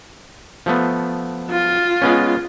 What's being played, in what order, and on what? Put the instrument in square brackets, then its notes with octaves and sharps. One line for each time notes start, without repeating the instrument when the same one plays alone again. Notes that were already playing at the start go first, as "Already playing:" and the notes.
[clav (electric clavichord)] F3 A3 B3
[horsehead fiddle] F4
[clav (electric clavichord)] G#3 B3 C#4